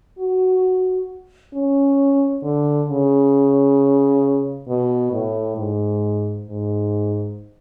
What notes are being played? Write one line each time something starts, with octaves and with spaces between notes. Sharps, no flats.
F#4
C#4
D3
C#3
B2
A2
G#2
G#2